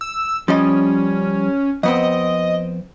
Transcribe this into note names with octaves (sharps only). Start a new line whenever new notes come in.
E6
F3 G3 C#4 D#5
F2 B3 C4 D#5